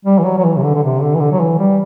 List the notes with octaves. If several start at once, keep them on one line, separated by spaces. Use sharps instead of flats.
G3
E3
F#3
F#3
E3
C3
D3
D3
C3
D3
E3
D3
F#3
E3
G3